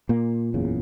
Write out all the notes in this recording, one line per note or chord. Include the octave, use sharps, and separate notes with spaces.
A#2 A#3
F#1 E2 C#3